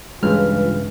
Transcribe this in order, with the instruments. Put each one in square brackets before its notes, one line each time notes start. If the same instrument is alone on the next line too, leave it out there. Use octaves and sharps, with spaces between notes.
[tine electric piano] G2 C#3 F6 [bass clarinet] E3 [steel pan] G#3 [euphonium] F4